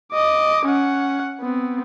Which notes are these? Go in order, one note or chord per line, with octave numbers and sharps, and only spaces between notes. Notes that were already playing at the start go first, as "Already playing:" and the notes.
D#5 D6
C#4 F#5
B3 C4